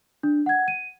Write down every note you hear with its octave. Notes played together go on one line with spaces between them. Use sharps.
D4
F#5 G#6
D#7